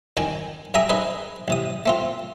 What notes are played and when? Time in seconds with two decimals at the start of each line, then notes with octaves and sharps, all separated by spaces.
0.17 F2 D#3 G5 G#5
0.74 F#2 G#4 E5 G5 A#5 D#6
0.89 D#4 G#4 B4 C5
1.48 A1 C3 D#6
1.86 A3 C4 F4